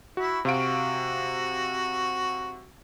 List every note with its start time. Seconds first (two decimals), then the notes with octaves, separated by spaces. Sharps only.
0.17 E4 F#4
0.45 C3 F#4 F5 D7